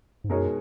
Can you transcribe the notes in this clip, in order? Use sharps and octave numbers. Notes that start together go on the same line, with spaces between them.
G#2
F#2 B2 G#3 D#4 A#4 C#5